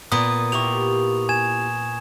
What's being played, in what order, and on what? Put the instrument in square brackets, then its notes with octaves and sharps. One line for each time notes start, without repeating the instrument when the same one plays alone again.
[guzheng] A#2 B3 [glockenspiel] D#6
[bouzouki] A#3 E4 G4 [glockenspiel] C#6 F7
[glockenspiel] G#5 G#6 E7